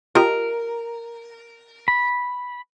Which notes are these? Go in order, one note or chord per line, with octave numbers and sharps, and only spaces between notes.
F4 G4 A#4 D#5
B5